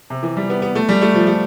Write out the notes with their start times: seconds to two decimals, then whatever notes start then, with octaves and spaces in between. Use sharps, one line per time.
0.10 C3
0.23 E3
0.37 G3
0.50 B3
0.62 B3
0.75 A3
0.89 G3
1.02 A3
1.14 F3
1.27 A3